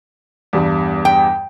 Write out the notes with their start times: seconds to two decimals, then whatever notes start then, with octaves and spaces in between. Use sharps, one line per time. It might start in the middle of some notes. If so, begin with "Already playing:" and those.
0.53 E2 G2 G3
1.05 G5